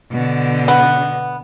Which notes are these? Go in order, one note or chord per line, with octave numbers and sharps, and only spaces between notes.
B2 D3
B3